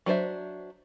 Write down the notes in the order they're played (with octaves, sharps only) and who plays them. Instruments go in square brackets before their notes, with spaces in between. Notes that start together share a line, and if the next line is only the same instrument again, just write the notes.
[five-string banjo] F#3 D4 C5 E5